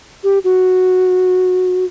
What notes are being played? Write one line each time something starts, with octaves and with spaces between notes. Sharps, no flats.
G4
F#4